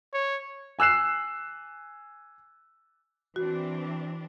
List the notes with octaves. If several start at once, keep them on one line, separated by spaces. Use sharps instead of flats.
C#5
G#5 E6 F#6 C7 E7
E3 C4 D4 F#4